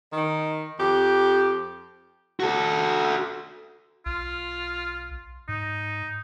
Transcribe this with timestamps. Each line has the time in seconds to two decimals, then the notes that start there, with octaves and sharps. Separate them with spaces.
0.13 D#3
0.79 F2 G4
2.40 F#4 A4
4.06 B1 F4
5.49 G#2 D#4